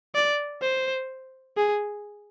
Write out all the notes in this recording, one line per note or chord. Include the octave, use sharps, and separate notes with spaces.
D5
C5
G#4